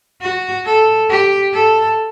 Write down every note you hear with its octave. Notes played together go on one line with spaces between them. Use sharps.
F#4
A4
G4
A4